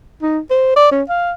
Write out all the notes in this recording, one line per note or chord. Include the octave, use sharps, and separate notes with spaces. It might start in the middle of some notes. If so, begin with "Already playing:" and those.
D#4
C5
D5
C#4
F5